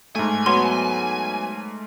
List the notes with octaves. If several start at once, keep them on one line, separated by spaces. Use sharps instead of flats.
G#2 A3 G#5
F#3 B3 C6